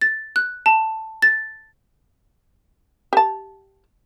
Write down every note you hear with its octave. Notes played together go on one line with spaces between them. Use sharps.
A6
F#6
A5
A6
G4 A5